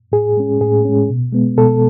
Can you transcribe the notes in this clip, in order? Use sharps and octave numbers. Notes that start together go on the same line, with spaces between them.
A2 G#4
G#3 C#4
A2 G#4
G#3 C#4
B2
G#3 B3
B2 A4